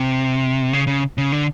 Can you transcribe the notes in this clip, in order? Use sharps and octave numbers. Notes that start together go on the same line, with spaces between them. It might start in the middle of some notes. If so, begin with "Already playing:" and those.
Already playing: C3
C#3
C#3
C#3
D3